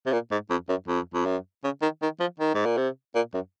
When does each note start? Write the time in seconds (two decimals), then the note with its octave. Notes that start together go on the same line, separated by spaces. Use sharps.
0.06 C3
0.12 A#2
0.31 G#2
0.50 F2
0.69 F#2
0.88 F2
1.14 F2
1.25 F#2
1.64 C#3
1.82 D#3
2.02 D#3
2.20 F3
2.40 D#3
2.55 G#2
2.66 A#2
2.77 C3
3.15 A#2
3.34 F#2